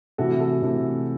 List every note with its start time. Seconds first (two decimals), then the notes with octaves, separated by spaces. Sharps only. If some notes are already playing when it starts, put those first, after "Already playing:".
0.18 C3 E3 A3 F#4 A4
0.40 F#4 A4
0.62 C3 E3 A3